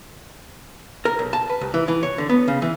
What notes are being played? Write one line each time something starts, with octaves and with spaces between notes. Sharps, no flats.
A#4
B1
A5
B4
C2
E3
E3
C#5
D3
B3
C#3
E3